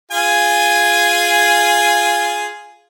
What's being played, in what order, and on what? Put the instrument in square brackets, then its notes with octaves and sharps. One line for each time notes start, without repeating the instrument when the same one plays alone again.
[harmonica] F4 G#4 G#5